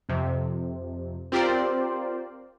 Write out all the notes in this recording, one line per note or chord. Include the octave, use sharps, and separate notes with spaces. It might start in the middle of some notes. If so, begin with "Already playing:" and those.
F2 C3
C4 F4 G4 A#4 C5 D5